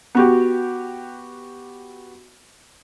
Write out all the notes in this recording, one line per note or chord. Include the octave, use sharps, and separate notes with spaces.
B3 F#4 G4